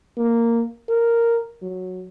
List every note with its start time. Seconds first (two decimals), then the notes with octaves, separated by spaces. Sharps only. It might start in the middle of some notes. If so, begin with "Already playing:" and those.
0.18 A#3
0.89 A#4
1.62 F#3